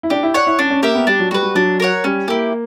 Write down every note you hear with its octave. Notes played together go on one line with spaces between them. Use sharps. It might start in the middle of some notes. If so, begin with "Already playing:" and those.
E4
D4 G4
E4
C#5 D5 F#5
E4
C#4 D4
C#4
A#3 G4 A#4 E5
B3
G3 D4
F#3
G3 F#4 B4
G3
F#3 D4
A#4 C#5 F#5
G3 C#4
A#3 E4 G4